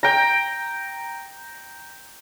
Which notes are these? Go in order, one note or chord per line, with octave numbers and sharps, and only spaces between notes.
G5 A#5